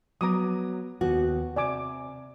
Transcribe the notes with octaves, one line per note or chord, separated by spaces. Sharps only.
F#3 B3 A#5 D6 D#6
D#2 B3 F#4
C3 D5 G#5 D6